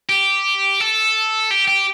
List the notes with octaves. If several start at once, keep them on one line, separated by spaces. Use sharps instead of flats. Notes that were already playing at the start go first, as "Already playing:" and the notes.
G4
A4
G4
G4